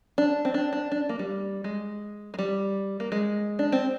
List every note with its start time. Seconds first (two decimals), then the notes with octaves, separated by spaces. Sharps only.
0.18 D4
0.45 C4
0.54 D4
0.73 D4
0.92 D4
1.09 A#3
1.19 G3
1.64 G#3
2.34 G#3
2.39 G3
3.00 A#3
3.12 G#3
3.59 D4
3.72 C4